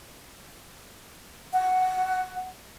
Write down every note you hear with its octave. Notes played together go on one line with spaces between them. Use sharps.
F#5